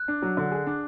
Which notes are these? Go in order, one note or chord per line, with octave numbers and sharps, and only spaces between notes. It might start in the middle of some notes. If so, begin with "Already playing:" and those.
Already playing: F#6
D4
F#3
D3
G#4
D4